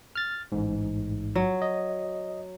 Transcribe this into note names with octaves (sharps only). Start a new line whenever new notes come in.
F6 A6
A1 G#2
F#3
D#5